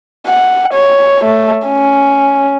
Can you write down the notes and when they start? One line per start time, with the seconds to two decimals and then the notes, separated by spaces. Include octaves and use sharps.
0.27 F#5
0.74 C#5
1.24 A3
1.67 C#4